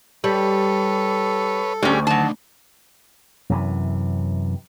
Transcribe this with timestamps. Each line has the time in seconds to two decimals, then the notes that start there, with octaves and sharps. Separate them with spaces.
0.24 G3 A4 B4 C#5
1.83 D2 G3 C#4 G#4 D5 G#5
2.07 D3 D#3 F#3 A5
3.50 F#2 C3 E3